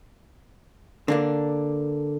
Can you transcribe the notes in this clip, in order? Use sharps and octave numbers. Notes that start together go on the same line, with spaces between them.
D3 A#3 D4